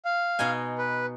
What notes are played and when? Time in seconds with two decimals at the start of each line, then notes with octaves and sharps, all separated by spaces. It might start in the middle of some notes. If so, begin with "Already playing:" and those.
0.05 F5
0.39 B2 D#4 G#5
0.78 B4